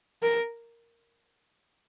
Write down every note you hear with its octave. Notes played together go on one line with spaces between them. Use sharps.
A#4